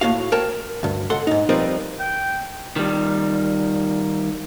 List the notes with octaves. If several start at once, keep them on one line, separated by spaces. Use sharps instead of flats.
A2 A#3 F#4 F5
A#4 C#5 G5 A5
D2 G2
C#2 A4 F#5 C6
G#2 D#4
F3 G3 C4 D#4 A#4 B4
G5
D#3 G3